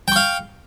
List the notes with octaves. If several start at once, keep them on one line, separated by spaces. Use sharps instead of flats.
F5 G5 C#6